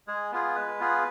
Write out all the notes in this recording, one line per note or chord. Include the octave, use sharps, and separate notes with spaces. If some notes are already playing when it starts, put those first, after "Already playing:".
G#3 G#4
B3 F4 G#4
G#3 B4
B3 F4 G#4